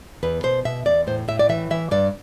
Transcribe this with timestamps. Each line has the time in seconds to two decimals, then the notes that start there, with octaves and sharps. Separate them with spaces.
0.23 E2 B4
0.43 B2 C5
0.65 B2 E5
0.86 E2 D5
1.07 A2 C5
1.28 A2 E5
1.39 D5
1.49 E3 E5
1.71 E3 E5
1.91 G2 D5